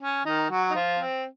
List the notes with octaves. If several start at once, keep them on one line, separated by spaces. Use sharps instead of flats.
C#4
D#3 D#4
F#3 F#4
D#4
F3 F4
C4